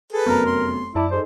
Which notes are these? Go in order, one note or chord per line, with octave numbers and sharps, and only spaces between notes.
G#4 A4 B4
F1 F#2 B3 A#4 A#5
C6
F#2 E4 D5 A5 D6
D#4 G#4 A4 C5